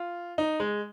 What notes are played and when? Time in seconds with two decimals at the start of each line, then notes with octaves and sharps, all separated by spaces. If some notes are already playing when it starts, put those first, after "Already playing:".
Already playing: F4
0.38 D#4
0.60 G#3